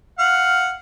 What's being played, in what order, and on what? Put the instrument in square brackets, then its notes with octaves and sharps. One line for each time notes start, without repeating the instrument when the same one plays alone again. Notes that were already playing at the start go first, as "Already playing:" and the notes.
[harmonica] F5 F#5